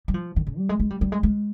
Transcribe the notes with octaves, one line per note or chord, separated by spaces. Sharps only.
G3
F3
D#3
C#3
G3
G#3
G#3
G3
G3
G#3
G#3